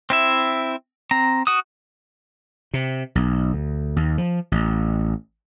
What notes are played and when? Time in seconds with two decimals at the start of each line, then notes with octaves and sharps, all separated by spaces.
0.10 C4 E4 E5
1.11 C4 A#5
1.47 F#4 D#6
2.74 C3
3.15 B1
3.53 D2
3.96 D#2
4.18 F3
4.52 A1